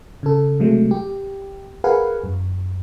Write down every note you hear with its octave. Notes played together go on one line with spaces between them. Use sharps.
C#3 A4
C3 F#3 G#3 A3
G4
G#4 A#4 B4 F5 F#5 G#5
F#2